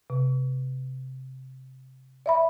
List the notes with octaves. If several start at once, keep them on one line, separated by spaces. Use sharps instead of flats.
C3
D5 E5 B5